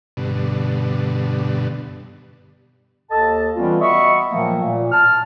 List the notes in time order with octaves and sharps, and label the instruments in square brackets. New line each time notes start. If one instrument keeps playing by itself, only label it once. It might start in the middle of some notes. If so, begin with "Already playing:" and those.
[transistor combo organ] G2 B2 D3
[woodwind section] D#2 A4 D#5 A5
E3 G3 B3 C#4 F4
F#4 D#5 E5 B5 C#6
A#2 D#3 F3 F#3 A3 A#3
A#2
A5 F6